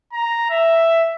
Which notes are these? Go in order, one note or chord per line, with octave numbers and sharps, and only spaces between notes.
A#5
E5